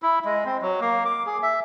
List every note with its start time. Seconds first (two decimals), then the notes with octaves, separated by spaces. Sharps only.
0.02 E4
0.25 G#3
0.46 C4
0.62 F#3
0.81 A#3
1.05 D6
1.26 G#4
1.43 E5